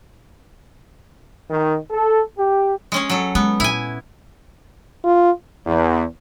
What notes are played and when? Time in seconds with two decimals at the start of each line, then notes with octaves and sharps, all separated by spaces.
1.50 D#3
1.91 A4
2.37 G4
2.92 G#3 C#4 C#5
3.10 F#3 A4
3.35 G#3 B3
3.60 A#2 E4 G#5
5.04 F4
5.66 E2